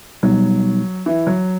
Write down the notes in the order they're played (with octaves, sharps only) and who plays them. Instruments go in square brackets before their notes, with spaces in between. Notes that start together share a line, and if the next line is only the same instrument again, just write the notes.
[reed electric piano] B2 G3 B3 D#4 [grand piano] F#3
[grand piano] E3
F#3